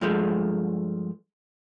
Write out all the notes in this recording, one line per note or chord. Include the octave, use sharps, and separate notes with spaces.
G2 F3 G#3 A3